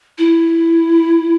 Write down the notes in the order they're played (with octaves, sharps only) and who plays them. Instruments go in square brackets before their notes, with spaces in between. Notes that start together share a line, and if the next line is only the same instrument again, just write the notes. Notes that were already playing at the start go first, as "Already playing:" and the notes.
[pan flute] E4